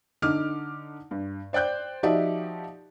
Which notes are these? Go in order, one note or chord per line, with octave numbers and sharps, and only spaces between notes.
D3 D#4 D6 F6
G2
C5 D5 G5 F#6 G6
F3 D#4 F#4 G4 D5 E5